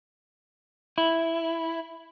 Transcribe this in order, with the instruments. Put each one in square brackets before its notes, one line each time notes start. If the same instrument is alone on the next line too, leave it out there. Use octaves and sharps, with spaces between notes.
[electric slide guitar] E4